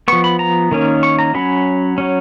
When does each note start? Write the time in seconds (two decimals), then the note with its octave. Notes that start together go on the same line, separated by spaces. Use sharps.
0.08 F3 B3 C#6
0.24 B5
0.39 A#5
0.72 D#3 A#3 C#4
1.03 C#6
1.19 A#5
1.34 F#3 C#4 B5
1.98 F#3 C#4